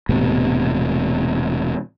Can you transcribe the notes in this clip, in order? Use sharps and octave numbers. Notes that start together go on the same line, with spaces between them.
E1 A2 C3 B3